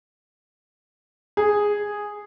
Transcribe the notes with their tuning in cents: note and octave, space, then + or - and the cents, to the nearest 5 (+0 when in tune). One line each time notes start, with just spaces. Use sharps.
G#4 -5